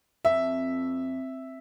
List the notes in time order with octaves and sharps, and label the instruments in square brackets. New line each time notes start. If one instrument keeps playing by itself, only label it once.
[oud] F2 [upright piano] E5